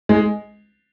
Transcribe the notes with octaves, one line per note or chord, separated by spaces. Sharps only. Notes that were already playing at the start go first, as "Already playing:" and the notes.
G#3